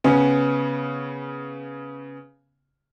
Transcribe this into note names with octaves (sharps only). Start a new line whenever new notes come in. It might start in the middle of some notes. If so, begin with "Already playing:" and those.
C#3 B3 C#4